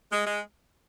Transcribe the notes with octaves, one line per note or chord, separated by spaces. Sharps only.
G#3
G#3